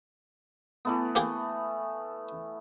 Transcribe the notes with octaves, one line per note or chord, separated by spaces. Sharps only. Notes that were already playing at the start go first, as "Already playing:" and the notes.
E3 A3 B3
A#3 G4 G#4